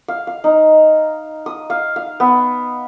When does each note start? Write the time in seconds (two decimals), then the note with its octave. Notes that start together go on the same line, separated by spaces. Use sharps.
0.08 F5
0.27 F5
0.44 D#4
1.46 D#6
1.70 F5
1.96 F5
2.20 B3